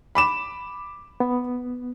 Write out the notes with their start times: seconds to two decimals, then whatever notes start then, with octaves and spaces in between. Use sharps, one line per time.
0.15 B5 D6 E7
1.20 B3